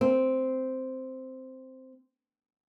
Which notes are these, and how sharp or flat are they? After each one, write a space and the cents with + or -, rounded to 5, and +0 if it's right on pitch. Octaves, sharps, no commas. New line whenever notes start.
C4 -5